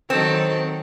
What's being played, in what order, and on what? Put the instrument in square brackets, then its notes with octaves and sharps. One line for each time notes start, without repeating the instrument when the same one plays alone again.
[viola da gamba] D#3 F#3 A4 [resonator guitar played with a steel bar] C4